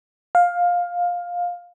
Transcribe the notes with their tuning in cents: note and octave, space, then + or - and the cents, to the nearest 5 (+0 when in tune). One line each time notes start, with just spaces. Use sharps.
F5 +15